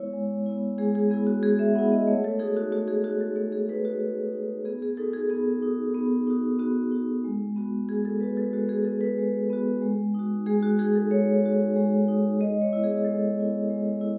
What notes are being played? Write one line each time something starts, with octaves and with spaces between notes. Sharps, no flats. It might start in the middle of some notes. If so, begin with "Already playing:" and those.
Already playing: G#3 B3 E4 C#5
G#3
B3 E4
G#3 G#4
G#4
B3 E4 G#4
F#4
G#3 G#4
E5
B3 E4 F#5
D#5
A3 C#5
A4
D#4 F#4 G#4
F#4
A3 F#4
G#4
D#4 F#4
A4
A3 F#4
G#4
D#4 F#4 B4
F#4
A3
D#4 F#4
B3 G#4
G#4
D#4 F#4 A4
G#4
B3 G#4
D#4 F#4
B3
D#4 F#4
B3 F#4
D#4 F#4
G#3
B3 F#4
G#3 G#4
A4
B3 F#4 B4
A4
G#3 F#4
G#4
B3 F#4 A4
B4
G#3
B3 F#4
G#3
D#4 F#4
G#3 G#4
F#4
D#4 F#4 G#4
A4
G#3 C#5
D#4 F#4
G#3
D#4 F#4
G#3 D#5
C#5
B3 E4
G#4
G#3 A4
B3 E4
G#3
E4